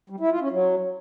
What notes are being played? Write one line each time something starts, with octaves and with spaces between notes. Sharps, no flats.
G3
E4
F4
C#4
F#3